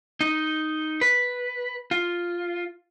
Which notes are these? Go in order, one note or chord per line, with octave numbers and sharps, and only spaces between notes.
D#4
B4
F4